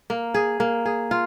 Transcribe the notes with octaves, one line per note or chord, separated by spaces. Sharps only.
A#3
G#4
A#3
G#4
F4